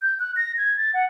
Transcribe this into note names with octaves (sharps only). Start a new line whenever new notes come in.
G6
F#6
A#6
G#6
A6
F#5